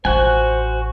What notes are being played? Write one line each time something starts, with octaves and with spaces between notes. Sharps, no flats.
A1 F4 F#4 C5 F#5 G#5